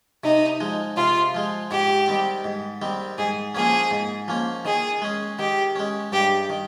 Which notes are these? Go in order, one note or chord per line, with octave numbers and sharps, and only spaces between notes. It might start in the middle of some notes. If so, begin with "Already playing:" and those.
C3 D#4
F3 G#3
C3 F4
F3 G#3
G#2 G4
D#3 G3 C4
G#2
D#3 G3 C4
G#2 G#4
F3 A#3 C#4 G#4
G#2
F3 A#3 C#4
D#3 G#4
G#3 C#4
D#3 G4
G#3 C#4
G2 G4
D#3